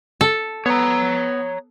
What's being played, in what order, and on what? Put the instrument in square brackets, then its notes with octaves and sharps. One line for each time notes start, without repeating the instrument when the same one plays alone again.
[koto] A4
[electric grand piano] B3 [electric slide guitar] C#5 A#5